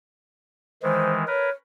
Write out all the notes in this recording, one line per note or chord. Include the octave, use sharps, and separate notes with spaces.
D#3 E3 G#3 C5
A#4 B4 C#5